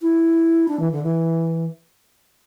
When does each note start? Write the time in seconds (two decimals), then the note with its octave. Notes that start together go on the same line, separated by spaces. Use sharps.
0.02 E4
0.68 D4
0.80 E3
0.92 D3
1.03 E3